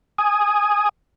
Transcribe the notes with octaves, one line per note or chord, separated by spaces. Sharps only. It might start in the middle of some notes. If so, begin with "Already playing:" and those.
G#5 D#6